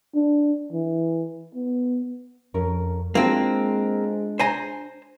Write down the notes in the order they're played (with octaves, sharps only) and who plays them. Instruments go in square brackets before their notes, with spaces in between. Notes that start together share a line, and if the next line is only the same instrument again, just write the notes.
[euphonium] D4
E3
B3
[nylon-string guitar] F2 C#4 A#4
[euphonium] G#3 [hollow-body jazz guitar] A#3 C4 [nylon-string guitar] D4 F4 F#4
[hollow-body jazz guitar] C5 G#5 A#5